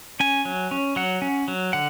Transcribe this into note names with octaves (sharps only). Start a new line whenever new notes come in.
C#4 G#5
F#3
C#4
F#3 F#5
C#4
F#3
D3 F#5